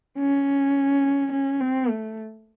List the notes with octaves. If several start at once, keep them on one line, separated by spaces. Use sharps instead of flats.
C#4
C#4
C4
A3